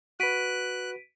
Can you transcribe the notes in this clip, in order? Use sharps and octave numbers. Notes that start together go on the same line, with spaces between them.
F#4 B4 F#6 B6 D7 D#7